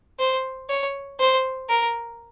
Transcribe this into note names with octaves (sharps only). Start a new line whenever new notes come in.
C5
C#5
C5
A#4